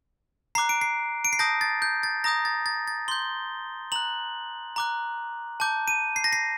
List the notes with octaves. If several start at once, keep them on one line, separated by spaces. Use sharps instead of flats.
A#5 D6 F#6 C7
D7
C7
D7
C7
A5 D#6 G6 A#6
A6
G6
A6
A#5 D#6 G6 A#6
A6
A6
A6
C6 G6 G7
A#5 F#6 F#7
A#5 D6 F#6
A5 D6 G6
D#7
C7
A#6
C7